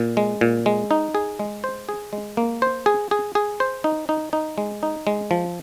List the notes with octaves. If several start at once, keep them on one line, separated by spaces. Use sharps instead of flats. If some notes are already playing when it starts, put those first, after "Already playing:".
Already playing: A#2
G#3
A#2
G#3
D#4
G#4
G#3
C5
G#4
G#3
A#3
C5
G#4
G#4
G#4
C5
D#4
D#4
D#4
G#3
D#4
G#3
F3